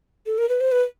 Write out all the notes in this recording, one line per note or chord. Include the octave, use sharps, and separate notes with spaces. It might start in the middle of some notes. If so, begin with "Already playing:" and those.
A4
A#4
B4
C5
B4